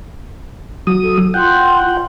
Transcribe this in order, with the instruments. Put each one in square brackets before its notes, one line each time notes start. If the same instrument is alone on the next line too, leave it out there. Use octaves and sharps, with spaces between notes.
[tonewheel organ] F#3 D#6
[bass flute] A4
[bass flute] F4 [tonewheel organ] F#5 G5
[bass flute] F4